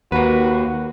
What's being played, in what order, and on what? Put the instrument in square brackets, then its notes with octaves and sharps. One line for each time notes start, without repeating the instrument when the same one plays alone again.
[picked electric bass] D#2 [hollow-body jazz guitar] A#3 B4 [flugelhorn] F#4